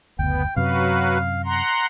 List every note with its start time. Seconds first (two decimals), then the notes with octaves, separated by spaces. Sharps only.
0.19 F#1 D2 B3 G5
0.56 F#2 C3 F#3 F#4 B4 F5
1.45 F#5 A#5 C6